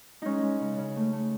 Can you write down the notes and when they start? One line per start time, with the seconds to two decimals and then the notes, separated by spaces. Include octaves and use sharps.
0.22 G#3 C#4 D#4
0.42 G#3
0.61 C#3
0.78 C#3
0.96 A3
1.13 A3